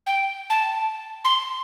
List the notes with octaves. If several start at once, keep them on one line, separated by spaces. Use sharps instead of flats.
G5
A5
C6